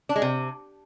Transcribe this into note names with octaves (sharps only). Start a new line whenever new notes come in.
D4
G#3
C3